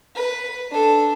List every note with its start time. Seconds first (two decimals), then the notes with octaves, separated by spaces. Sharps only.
0.15 B4
0.71 D4 A4